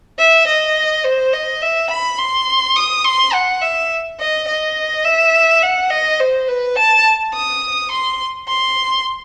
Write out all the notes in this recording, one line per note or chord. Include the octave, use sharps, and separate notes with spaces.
E5
D#5
C5
D#5
E5
B5
C6
D#6
C6
F#5
E5
D#5
D#5
E5
F#5
D#5
C5
B4
A5
D#6
C6
C6